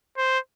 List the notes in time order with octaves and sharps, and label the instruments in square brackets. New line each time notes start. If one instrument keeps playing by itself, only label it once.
[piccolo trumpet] C5